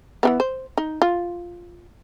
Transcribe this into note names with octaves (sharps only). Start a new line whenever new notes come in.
E3 G#3 B3
C5
D#4
F4